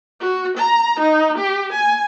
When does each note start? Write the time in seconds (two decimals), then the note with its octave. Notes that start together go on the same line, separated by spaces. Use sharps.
0.20 F#4
0.58 A#5
1.00 D#4
1.38 G4
1.73 G#5